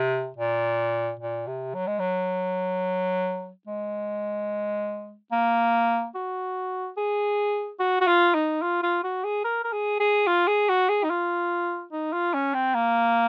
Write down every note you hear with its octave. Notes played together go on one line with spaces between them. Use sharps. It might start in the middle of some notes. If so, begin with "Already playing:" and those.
Already playing: C3
A#2
A#2
C3
F#3
G#3
F#3
G#3
A#3
F#4
G#4
F#4
F#4
F4
D#4
F4
F4
F#4
G#4
A#4
A#4
G#4
G#4
F4
G#4
F#4
G#4
D#4
F4
D#4
F4
C#4
C4
A#3